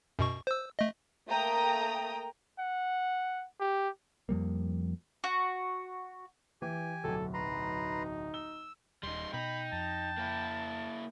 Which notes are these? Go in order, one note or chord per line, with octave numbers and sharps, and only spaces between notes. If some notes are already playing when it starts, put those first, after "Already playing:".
F#2 B2 C#6
C5 E6
A3 D#5
A3 A#3 G5 A#5 D#6
F#5
G4
F2 F3 G3 A#3
F#4
E3 G4 G#5
D1 B1 A4
D#4 B4 A#5 C6
E6 G7
D#1 G3 D#4 C6
B2 D#4 G5 B5
F2 A5
A#3 E4